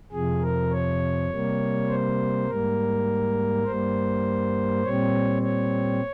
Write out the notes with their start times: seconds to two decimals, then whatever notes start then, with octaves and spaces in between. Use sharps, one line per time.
0.12 F2 C3 F3 G#4
0.42 A#4
0.71 C#5
1.30 C3 G3 A#3
1.89 C5
2.47 G#2 G3 A#3 A#4
3.65 G2 G3 A#3 C5
4.83 A#2 G3 C4 C#5
5.42 C#5